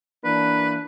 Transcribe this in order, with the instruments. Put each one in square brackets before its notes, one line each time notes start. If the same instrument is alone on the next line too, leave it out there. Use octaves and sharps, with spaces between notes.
[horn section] E3 A#3 D4 [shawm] B4